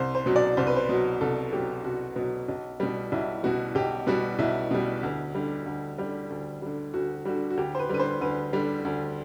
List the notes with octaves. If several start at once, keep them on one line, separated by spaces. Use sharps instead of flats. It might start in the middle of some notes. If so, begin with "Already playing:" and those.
Already playing: C2 C5
C5
B2 F#3
D5
C2 C5
B4
C5
B2 F#3
C2 A4
B2 F#3 G4
C2 F#4
B2 F#3
B1
B2 G3
B1 E4
B2 G3 F#4
B1 G4
B2 G3 F#4
B1 E4
B2 G3
D2
D3 G3
D2
D3 G3
D2
D3 G3
D2 F#4
D3 G3 F#4
F#4
D2 G4
C5
B4
D3 G3 B4
C5
D2 B4
D3 G3
D2